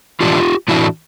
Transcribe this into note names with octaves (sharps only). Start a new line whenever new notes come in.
A2 E3 A3 D4 F4 G4
A2 E3 A3 D4 E4 F#4